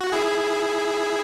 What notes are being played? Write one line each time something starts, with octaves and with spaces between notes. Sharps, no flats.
F#4
E4 G#4